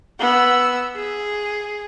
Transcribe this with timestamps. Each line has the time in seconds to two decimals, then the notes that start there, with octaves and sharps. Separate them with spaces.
0.19 B3 E6
0.96 G#4